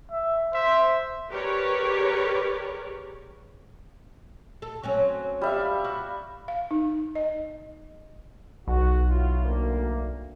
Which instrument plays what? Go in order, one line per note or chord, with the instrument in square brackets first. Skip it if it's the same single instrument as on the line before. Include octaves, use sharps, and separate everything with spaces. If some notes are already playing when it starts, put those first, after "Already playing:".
[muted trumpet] E5
[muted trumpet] C5 [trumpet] E5
[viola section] G4 G#4 A#4 B4 C#5 D5
[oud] A4
F#3 C4 C#4
[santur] G3 E5 F5
[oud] F#4
[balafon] F5
D#4
D#5
[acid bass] B1 [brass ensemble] F#4
[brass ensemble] F#3 E4 F4
D2 A#3